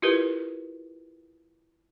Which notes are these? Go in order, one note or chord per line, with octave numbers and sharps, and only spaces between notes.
E4 F4 G4 A#4 B4